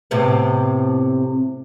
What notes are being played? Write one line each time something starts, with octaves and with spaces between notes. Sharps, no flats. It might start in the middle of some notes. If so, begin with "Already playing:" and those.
A2 C3 B3